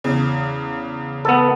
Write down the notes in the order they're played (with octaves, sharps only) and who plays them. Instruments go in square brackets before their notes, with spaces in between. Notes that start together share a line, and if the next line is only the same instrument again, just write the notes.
[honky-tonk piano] E2 C#3
[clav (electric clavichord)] B3 A4